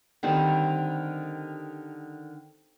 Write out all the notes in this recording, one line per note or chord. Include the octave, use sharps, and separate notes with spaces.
D3 D#3 G3 C4